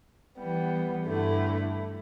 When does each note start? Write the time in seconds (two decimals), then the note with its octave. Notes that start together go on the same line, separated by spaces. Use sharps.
0.37 E3 G3 B3
1.05 G2 D3 A3 E4